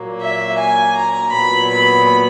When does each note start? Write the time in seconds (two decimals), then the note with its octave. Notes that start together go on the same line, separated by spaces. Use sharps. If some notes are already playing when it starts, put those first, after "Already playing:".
Already playing: A#2 F#3 A#3
0.22 E5
0.59 G#5
0.97 A#5
1.33 A#2 F#3 B3 B5
1.71 B5